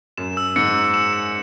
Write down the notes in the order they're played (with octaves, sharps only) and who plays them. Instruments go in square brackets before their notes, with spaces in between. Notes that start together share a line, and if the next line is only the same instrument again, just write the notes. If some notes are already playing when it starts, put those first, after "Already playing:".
[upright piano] F#2 [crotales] E7
[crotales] E6
[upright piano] G#2 [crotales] C#7
[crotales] E6
E7
C#7